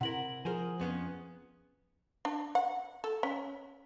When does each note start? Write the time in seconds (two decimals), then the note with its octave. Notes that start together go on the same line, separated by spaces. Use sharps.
0.01 C3 E4 A#4 F#5 F#7
0.45 F3 G#4 A#4 C5 G#5
0.80 F2 B3 C#4
2.25 D4
2.55 F#5
3.04 A4
3.23 C#4